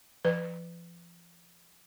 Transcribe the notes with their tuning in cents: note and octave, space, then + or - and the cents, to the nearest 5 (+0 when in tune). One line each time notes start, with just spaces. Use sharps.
F3 -30 B4 +20